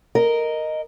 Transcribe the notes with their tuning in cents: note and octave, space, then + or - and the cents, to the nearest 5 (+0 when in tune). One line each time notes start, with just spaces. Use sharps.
A#4 +0 D#5 +0